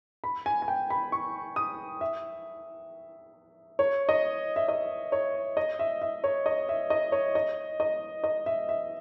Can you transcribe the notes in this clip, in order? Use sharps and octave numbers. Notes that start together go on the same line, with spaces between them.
B5
G#5
G#5
G5
B5
C#6
D#6
E5
C#5
D#5
E5
D#5
C#5
D#5
E5
E5
C#5
D#5
E5
D#5
C#5
D#5
D#5
D#5
E5
E5